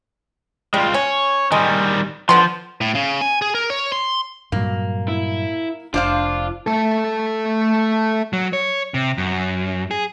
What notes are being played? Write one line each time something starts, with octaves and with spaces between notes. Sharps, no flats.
G3 G#3 F4
C#4 C#5
D#3 G3 G#3
D3 F3 B3 C6
A2
C#3
G#5
G#4
A#4
C#5
C6
G2 A#2 F#3 A#3
E4
F1 D4 F4 C5 F5
A3 A4
F#3
C#5
C3
F#2
G#4